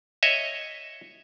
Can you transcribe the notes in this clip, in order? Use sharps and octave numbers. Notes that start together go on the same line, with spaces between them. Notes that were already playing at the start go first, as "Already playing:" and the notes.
C#5 D#5 E5